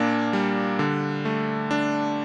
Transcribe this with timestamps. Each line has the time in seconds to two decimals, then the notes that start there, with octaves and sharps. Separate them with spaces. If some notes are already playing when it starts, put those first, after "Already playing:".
Already playing: A#2 A#3 D4
0.33 G3
0.79 D3
1.25 A3
1.71 D4